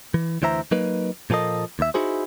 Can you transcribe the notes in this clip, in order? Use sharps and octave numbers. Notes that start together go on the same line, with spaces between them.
E3
D2 E3 C5 E5 A#5
F#3 A#3 D#4 B4
A#2 F3 A#3 A4 D#5
D#2 E5
D#4 E4 F#4 G#4 C5